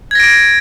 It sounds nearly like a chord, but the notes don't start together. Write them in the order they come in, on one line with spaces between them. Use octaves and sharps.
G#6 A#6 D7